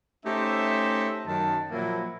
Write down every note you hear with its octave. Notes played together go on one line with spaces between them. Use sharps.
A3 C#4 D#4 G4 C5 E5
F#2 D#3 A5
A#2 F3 F#3 A#3 E4